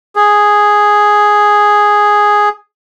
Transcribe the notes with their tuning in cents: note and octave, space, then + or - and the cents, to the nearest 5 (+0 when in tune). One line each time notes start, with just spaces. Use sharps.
G#4 +0